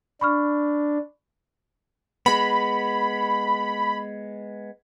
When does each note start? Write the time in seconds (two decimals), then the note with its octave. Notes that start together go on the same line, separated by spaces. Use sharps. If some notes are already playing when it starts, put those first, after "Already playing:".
0.21 D4 B5 C#6 F6
2.26 G#3 B3 B5